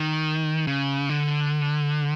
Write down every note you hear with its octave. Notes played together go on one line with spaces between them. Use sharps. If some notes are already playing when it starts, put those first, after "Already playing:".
Already playing: D#3
C#3
D3